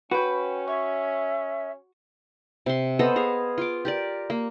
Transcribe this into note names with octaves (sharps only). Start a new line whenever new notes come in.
C#4 F#4 B4 G5
C#5 E5
C3 C6
B3 A4 C5 D#5
G#4 F5
F4 D6
G4 A#4 D5
A#3